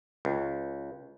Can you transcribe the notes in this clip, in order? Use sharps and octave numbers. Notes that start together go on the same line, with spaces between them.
C#2